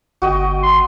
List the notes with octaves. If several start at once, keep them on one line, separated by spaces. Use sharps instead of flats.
G1 F#4 D#5 G5
C6